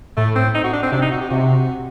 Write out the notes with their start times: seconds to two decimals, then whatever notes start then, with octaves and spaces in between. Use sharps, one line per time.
0.17 A2 A3
0.36 C4
0.55 D#4
0.64 F#4
0.73 D4
0.83 C4
0.92 C3 D4
1.02 D#4
1.11 F#4
1.21 G4
1.30 C3 F#4